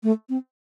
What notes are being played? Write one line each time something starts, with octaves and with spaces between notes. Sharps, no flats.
A3
C4